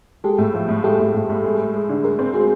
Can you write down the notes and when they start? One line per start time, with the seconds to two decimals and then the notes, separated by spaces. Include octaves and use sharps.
0.24 G#3 G4 A4
0.38 A2
0.54 F3
0.68 A2
0.83 G#3 G4 A4
1.00 A2
1.14 A2
1.30 A2
1.44 G#3
1.58 G#3
1.74 G#3
1.89 D3
2.04 G#3 G#4 A#4
2.19 C4
2.34 G#3 F#4 G#4